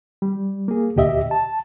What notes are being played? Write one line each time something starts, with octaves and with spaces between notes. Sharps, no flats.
G3
A#3 G#4
D2 A#2 G4 D#5 E5
A5